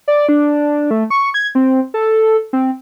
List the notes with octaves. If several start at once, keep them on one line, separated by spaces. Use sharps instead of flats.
D5
D4
A3
C#6
G#6
C4
A4
C4